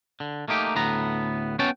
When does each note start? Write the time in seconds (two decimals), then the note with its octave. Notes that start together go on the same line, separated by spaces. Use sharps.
0.20 D3
0.48 A3 A#3 D#4 G4
0.75 D2 A2 B3 A#5
1.59 B3 C#4 F#4 C#5 G5 A5